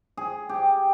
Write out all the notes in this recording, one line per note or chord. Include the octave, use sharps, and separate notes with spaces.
G#4
G4